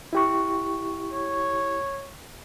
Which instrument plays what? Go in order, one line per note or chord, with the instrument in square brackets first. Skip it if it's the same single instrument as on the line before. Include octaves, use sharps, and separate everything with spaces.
[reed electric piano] E4 G4 C#6
[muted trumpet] C#5